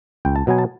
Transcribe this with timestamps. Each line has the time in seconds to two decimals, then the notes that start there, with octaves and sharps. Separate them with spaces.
0.25 C#2 G5
0.36 A5
0.47 B2 F#3 B3 G#5
0.58 A5